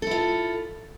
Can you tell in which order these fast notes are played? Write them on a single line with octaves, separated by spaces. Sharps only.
A4 E4 F4